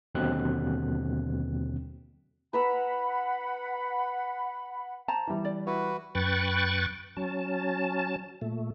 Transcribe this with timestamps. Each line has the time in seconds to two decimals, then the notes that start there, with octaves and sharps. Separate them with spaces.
0.15 D#2 B2 D3 F#3 C4 F#6
2.53 B4 F#5 A#5 B5 E6
5.08 C5 A5 A#5
5.27 E3 G3
5.45 D5
5.67 E4 F#4 B4
6.15 F#2 B4 G5 C#6 F#6 A6
7.17 F#3 C#4 A5
8.42 A#2 A3